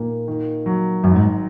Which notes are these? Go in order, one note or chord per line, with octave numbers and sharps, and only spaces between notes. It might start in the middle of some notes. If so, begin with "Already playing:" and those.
Already playing: A#2 D#3 A#3
D#3
F#3
G#1 F#2
G#2